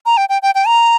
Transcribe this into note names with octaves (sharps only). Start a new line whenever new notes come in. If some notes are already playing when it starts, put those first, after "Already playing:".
A#5
G5
G5
G5
G5
A#5